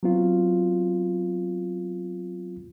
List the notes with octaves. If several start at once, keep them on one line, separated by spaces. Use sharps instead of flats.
F#3 B3 C4 F4